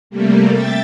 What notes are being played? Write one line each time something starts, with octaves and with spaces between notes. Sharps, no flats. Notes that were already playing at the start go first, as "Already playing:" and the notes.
C3 G3 A3 A#3
E5 G5 A6